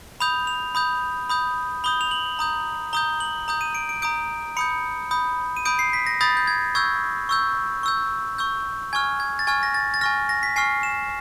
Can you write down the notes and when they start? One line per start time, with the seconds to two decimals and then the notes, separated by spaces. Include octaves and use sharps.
0.20 B5 D#6 G6 F7
0.47 F7
0.75 B5 D#6 G6
1.29 B5 D#6 G6
1.84 B5 D#6 G6 G7
2.01 F7
2.11 F#7
2.39 A#5 D#6 G6
2.93 A#5 D#6 G6 G7
3.20 F#7
3.48 A#5 D#6 G6
3.61 D#7
3.75 D7
3.89 D7
4.02 A#5 D#6 G6 D7
4.57 B5 D#6 G6 C#7
5.11 B5 D#6 G6
5.57 D#7
5.65 B5 D#6 G6 D7
5.79 C7
5.93 B6
6.07 A#6
6.21 B5 D#6 G6 A6
6.37 G6
6.47 G#6
6.75 C#6 E6 G6 G#6
7.29 C#6 E6 G6
7.83 C#6 E6 G6
8.38 C#6 E6 G6
8.93 G#5 C#6 F6 G#6
9.20 G#6
9.39 A6
9.47 G#5 C#6 F6 G#6
9.63 A#6
9.74 A6
9.94 A6
10.01 G#5 C#6 F6 A#6
10.29 A#6
10.43 B6
10.56 G#5 C#6 F6 C7
10.83 E7